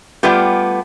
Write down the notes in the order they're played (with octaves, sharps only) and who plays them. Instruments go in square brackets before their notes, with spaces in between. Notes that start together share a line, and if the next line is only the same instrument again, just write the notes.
[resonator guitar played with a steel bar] G3 A3 B3 F4 G4